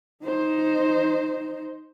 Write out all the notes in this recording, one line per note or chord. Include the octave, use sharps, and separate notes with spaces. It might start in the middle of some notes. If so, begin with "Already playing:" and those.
D#4 C5